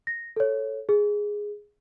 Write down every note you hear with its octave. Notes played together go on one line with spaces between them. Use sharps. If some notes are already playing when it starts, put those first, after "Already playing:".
A#6
A4 C#5
G#4